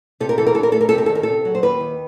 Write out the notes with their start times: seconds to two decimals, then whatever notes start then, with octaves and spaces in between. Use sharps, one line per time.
0.20 C3 A4
0.29 A#4
0.38 E3 A4
0.47 A#4
0.55 D4 A4
0.63 A#4
0.72 A3 A4
0.81 A#4
0.89 C3 A4
0.98 A#4
1.06 D#3 A4
1.15 A#4
1.23 C3 A4
1.45 F#3
1.55 C5
1.62 D#2 B4
1.80 D#3